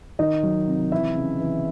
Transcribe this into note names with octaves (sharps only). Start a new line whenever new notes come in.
D#3 D#4 D#5
F#3
C3
E3 E4 E5
C#3
E3